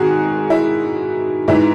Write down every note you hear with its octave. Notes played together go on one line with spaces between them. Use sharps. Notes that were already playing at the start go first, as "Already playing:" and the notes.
Already playing: G#2 D#3 F#4 G#4
E4
G#2 E3 E4